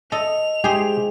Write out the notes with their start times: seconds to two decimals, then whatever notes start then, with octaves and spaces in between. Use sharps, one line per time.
0.12 A4 D#5 F7
0.64 G#3 G4 G#4 C5